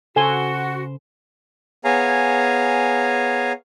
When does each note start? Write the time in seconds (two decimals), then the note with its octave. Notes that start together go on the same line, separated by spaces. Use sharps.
0.16 C#3 F#4 A4 C5 G#5 C6
1.85 B3 G#4 C#5 F5 G#5 A#5